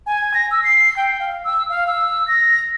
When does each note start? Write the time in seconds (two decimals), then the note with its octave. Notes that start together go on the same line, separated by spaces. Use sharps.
0.06 G#5
0.34 A#6
0.51 E6
0.63 C7
0.97 G5
1.20 F5
1.44 E6
1.69 F5
1.87 E6
2.27 A#6